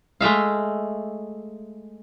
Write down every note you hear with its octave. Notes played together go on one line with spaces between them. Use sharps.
G#3 A3 E5 F5